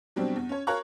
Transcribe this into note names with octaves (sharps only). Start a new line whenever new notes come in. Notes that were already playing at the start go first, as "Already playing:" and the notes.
B2 F#3 G3 C4 D4
E2
C#4 C#5
A#4 C#5 F5 A#5 C#6 F#6